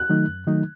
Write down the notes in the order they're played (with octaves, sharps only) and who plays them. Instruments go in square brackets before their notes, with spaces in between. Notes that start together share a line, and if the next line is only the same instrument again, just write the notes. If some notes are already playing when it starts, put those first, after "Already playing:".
Already playing: [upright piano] F#6
[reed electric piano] D#3 F#3 A3 D#4
F#2
D#3 F#3 A3 D#4